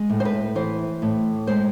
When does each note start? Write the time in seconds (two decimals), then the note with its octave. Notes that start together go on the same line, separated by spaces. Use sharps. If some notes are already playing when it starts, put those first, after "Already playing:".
Already playing: G#3
0.10 A2
0.20 C5
0.25 B4
0.55 E3 C5
1.02 A2
1.47 G#3 C5